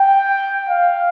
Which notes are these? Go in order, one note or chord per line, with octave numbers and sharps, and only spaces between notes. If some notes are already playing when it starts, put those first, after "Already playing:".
Already playing: G5
F5